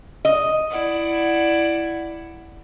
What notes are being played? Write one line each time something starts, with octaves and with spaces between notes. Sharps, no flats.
D#5
E4 D5 F#5